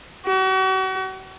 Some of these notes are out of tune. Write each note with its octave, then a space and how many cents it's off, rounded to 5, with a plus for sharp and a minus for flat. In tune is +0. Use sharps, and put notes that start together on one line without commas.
F#4 +40